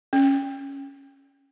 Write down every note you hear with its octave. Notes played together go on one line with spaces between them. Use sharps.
C#4